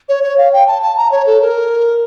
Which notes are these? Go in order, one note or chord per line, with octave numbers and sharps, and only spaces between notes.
C#5
C#5
F5
G5
A5
A5
A#5
C#5
A4
A#4